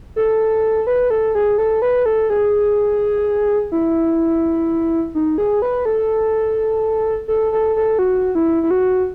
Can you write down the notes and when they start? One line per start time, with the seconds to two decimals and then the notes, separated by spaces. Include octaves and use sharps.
0.16 A4
0.87 B4
1.10 A4
1.35 G#4
1.58 A4
1.82 B4
2.06 A4
2.30 G#4
3.72 E4
5.15 D#4
5.38 G#4
5.62 B4
5.85 A4
7.28 A4
7.52 A4
7.76 A4
7.99 F#4
8.35 E4
8.63 E4
8.71 F#4